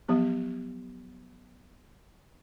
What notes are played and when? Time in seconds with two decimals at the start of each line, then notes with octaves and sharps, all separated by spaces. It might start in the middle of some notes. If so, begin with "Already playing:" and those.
0.08 F3 F#3 B3 G4